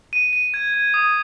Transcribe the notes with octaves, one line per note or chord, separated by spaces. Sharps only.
D#7
D#7
G#6
G#6
D#6